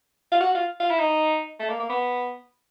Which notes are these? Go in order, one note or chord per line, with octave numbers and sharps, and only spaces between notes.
F4
F#4
F4
F4
E4
D#4
A3
A#3
A#3
B3